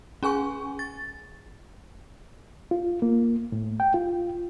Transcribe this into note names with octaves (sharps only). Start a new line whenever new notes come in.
C#4 G#4 G#5 C#6
A6
F4
A#3
A2
G5
F4